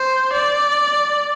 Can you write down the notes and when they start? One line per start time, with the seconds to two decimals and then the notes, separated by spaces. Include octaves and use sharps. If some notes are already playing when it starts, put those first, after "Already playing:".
Already playing: C5
0.33 D5